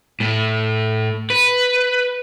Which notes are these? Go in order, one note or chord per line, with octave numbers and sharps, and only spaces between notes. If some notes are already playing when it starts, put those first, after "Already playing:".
A2
B4